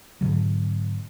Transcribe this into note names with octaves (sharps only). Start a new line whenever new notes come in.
G#2 B2 D3 F#3